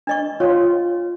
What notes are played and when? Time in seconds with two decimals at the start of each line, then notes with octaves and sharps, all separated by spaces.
0.07 D4 D#5 C#6
0.40 F4 C#5